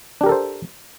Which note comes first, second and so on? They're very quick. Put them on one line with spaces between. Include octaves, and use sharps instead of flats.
D4 G4 A#4 A4 C5